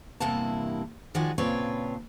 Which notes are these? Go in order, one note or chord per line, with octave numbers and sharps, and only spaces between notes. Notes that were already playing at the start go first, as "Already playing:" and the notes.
E2 G2 C3 A#3 E4 A5
D#3 F3 G#3 F#4 D5 G#5
A#2 C#3 C4 D4 B4 C#5